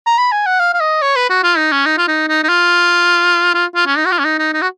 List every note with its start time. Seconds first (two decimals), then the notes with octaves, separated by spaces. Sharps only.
0.06 A#5
0.18 B5
0.32 G#5
0.46 F#5
0.60 F5
0.74 F5
0.80 D#5
1.02 C#5
1.16 B4
1.30 F#4
1.43 F4
1.57 D#4
1.72 C#4
1.86 D#4
1.97 F4
2.08 D#4
2.28 D#4
2.44 D#4
2.49 F4
3.54 F4
3.75 F4
3.86 C#4
3.97 D#4
4.06 F#4
4.12 F4
4.19 C#4
4.25 D#4
4.39 D#4
4.53 D#4
4.62 F#4